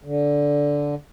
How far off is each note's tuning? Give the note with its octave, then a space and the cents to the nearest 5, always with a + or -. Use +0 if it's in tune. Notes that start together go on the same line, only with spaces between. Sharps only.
D3 -10